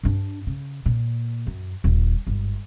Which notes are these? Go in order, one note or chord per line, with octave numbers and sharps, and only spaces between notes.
G2 D4
C#3
A#2
F#2
D#1
G1 G#2